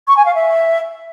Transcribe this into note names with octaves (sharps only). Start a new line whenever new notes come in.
C#6
G#5
F5
E5